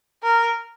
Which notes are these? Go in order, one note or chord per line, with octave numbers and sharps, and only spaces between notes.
A#4